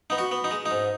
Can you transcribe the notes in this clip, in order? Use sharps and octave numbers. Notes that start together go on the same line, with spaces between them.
B3 D#4
F#4
B3
D#4
G#3
D#4
G#2